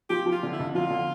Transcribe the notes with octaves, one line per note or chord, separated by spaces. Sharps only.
F3 G4
F3
F4
D3
E4
F2
F3 F4
D3